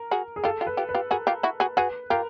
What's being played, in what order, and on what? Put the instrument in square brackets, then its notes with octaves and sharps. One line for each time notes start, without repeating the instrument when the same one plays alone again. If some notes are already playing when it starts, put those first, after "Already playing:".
Already playing: [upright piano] A#4
[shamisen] F#4 G#4
[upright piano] G#4
[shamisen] F4 G4 [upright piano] A4
[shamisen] F4 G4
[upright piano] B4
[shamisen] F4 G4
[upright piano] B4
[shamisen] F4 G4
[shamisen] F#4 G#4 [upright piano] A#4
[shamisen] F4 G4
E4 F#4
F#4 G#4
[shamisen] F#4 G#4 [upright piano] B4
[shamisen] F4 G4 [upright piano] A#4